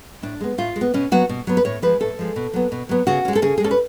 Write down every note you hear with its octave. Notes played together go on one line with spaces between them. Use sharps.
A2 D4
G#3 B3
A2 F4
G#3
B3
B2 C#4
F#3 B3 F#4
B2
F#3 B3
B4
A2 C#5
F3 G#3 B4
A2 A4
F3 G#3
B2
F#3 B3
B2
F#3 B3
C#3 F#4
G#3 C#4
A4
C#3 G#4
G#4
G#3 C#4 A4
B4